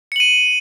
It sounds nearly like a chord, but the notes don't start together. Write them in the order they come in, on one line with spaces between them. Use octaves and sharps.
C#7 F#7 D#7